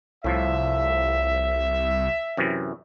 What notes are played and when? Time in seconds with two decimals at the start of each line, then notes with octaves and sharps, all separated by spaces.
0.24 C2 A2 F3 E5
2.37 F#2 C3 E3